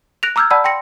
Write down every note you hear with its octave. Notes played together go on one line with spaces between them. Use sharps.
F#6 A#6 D7 F7
A#5 D6 E6 F6 G6 G#6
D5 F#5 A5 B5 E6
G5 C6 A#6 C#7